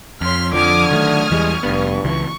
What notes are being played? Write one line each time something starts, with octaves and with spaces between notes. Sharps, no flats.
F2 C#5 C6 F6 B6
F2 D3 F3 D6 D#6 F6 G#6
D#3 F#3 A3 C#6
E2 E3 G3 G#3
F1 G2 B3
C#2 E3 C#6